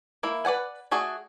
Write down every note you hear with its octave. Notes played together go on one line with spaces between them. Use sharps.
A#3 E4
B4 D5 F#5 G#5
A3 F#4 G#4 D5